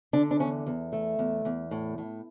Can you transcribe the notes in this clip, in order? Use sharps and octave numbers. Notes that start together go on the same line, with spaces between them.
D3 D4
D4
E2 C#4
E2
A3
E2
E2
A2
A2